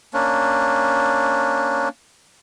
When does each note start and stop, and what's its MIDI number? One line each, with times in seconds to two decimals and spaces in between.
0.14 1.89 58
0.14 1.89 61
0.14 1.89 62